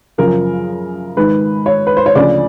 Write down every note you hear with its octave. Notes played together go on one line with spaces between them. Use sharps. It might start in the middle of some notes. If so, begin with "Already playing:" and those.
F#2 C#3 F3 A#4
G#2 D#3 B4
C#5
B4
C5
C#5
D2 C#3 F3 D5